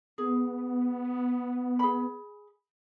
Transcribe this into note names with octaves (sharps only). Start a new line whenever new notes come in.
B3 G#4
G#4 B5